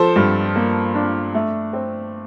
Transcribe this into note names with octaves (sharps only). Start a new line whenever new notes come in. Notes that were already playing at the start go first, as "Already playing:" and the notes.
Already playing: F3 A4 C5
G2
A#3
D4
A3
C4